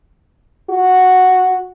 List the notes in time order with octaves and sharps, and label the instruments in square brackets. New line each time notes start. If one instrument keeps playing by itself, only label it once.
[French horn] F#4